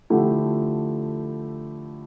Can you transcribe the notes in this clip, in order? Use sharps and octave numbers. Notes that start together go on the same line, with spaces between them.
D3 F3 A3 E4 G4